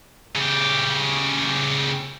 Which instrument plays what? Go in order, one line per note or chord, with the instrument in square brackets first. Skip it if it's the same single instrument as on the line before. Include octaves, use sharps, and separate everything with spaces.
[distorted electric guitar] C#3 G4